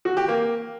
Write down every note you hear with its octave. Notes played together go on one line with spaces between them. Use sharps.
F#4
G4
A#3